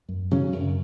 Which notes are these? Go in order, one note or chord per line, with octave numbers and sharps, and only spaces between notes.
F#2
C#3 F#3 C#4
F#2